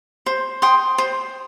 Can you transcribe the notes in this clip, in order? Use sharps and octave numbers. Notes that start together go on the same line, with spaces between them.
C5
G5 C6 D#6
C5